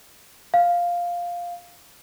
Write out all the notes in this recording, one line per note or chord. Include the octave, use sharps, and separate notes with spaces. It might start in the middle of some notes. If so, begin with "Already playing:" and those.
F5